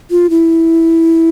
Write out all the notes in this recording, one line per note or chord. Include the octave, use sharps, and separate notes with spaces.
F4
E4